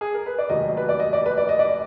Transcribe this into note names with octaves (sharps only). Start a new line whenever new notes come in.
G#4
A#4
B4
D5
F1 D#2 D#3 F#3 D#5
B4
D5
D#5
D5
B4
D5
D#5
D5